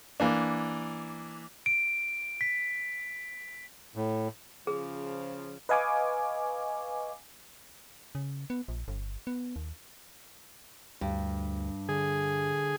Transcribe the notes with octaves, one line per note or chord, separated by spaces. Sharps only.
E3 A#3 D4
D7
B6
A2
C#3 F3 G#4
B4 D#5 F5 G#5 C#6 D6
C#3
B3
A#1
G1
B3
D#2
D2 G2
D3 G#4